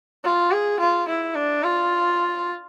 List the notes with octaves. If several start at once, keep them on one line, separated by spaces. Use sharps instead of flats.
F4
G#4
F4
E4
D4
F4